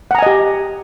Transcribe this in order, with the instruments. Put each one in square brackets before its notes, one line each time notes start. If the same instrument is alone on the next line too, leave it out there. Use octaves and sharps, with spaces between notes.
[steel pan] F#5
A#5
G#5
D#5
G4